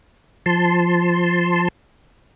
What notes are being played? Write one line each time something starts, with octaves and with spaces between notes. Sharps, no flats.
F3 A5 C6